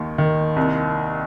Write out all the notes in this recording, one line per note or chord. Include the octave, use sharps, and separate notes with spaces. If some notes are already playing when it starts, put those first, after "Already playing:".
Already playing: D#2 D#3
D#3
C2